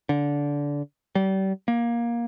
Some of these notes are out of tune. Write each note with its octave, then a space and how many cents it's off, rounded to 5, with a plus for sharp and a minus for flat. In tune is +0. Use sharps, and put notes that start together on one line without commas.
D3 -20
G3 -35
A#3 +15